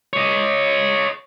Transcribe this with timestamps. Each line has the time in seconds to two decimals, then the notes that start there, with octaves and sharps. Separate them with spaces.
0.13 C#5 D#5